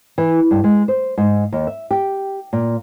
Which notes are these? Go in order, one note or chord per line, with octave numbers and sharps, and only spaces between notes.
E3
G2
G#3
C5
G#2
D#2
E5
G4
A#2